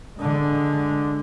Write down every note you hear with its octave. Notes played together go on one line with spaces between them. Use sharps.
D3 G#3